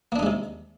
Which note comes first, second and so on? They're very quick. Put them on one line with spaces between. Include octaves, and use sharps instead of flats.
A#3 D4 D#4 G#3 C3